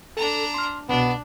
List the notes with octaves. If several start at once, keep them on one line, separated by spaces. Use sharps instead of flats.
D4 A4 A#5
C6 F6
C2 B2 B3 D4